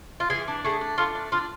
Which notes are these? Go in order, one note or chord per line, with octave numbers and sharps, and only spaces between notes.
F4
E3 G#4
D4
A3 G#4
D4
A3 F4
D4
D4 F4